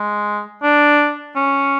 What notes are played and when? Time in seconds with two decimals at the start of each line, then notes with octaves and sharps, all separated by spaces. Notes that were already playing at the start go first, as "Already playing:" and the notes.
Already playing: G#3
0.63 D4
1.36 C#4